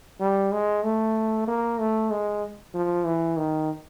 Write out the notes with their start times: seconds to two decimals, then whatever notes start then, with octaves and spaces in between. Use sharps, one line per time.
0.20 G3
0.52 G#3
0.84 A3
1.48 A#3
1.79 A3
2.11 G#3
2.75 F3
3.06 E3
3.37 D#3